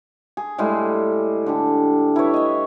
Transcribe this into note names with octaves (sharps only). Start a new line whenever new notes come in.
G#4
A2 G3 G#3
D3 D4 G4
E4 B4 C#5
D#5 E5